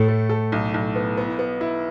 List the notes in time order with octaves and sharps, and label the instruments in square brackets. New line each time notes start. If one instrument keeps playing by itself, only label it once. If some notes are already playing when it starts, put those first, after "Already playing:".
Already playing: [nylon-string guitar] A2 [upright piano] A4
[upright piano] A3
A4
B1
B1
B3
B3
B3
E4